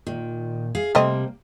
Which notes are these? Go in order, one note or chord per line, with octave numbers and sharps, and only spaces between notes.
A#2 D#3
G#4 F5
C3 G3 A3 A#3 C4 D#5